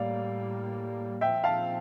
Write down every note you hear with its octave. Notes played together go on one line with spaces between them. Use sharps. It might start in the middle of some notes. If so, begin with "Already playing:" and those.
Already playing: A2 G3 A#3 D5 F5
A#2 F3 C4 E5 G5
F5 A5